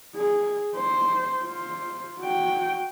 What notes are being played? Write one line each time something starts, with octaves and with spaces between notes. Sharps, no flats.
G#4
C5
F4 C5
F#4 G5